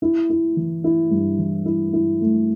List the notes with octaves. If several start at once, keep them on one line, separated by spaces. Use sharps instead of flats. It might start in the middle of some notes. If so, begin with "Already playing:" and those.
E4
E4
E3
E4
G2
E3
E4
E4
A3